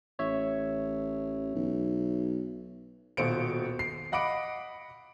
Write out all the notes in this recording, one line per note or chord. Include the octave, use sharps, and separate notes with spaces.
A1 C#5 E5
B1
D#1 B2 C5 C#7 D7
C7
D#5 F#5 B5 D6 D7